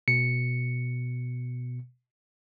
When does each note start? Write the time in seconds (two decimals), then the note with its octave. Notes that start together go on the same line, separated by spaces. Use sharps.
0.08 B2 C#7